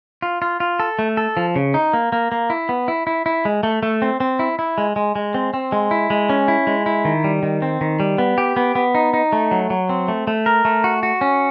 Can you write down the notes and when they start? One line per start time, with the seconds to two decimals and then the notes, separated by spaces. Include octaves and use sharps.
0.22 F4
0.42 F4
0.60 F4
0.80 A4
0.99 A3
1.17 A4
1.37 F3
1.56 C#3
1.74 D#4
1.94 A#3
2.12 A#3
2.32 A#3
2.50 E4
2.69 B3
2.88 E4
3.07 E4
3.26 E4
3.45 G#3
3.63 A3
3.83 A3
4.02 C4
4.20 C4
4.39 E4
4.59 E4
4.78 G#3
4.96 G#3
5.16 G#3
5.34 C4
5.54 C4
5.72 G#3
5.91 E4
6.10 G#3
6.29 C#4
6.48 E4
6.67 G#3
6.86 E4
7.05 D#3
7.24 G3
7.43 D#3
7.62 C4
7.81 D#3
8.00 G3
8.18 B3
8.38 G4
8.56 B3
8.75 B3
8.95 D#4
9.14 D#4
9.33 A3
9.51 F#3
9.70 F#3
9.89 C4
10.08 A3
10.27 A3
10.46 A#4
10.65 A3
10.84 F#4
11.03 F#4
11.21 C#4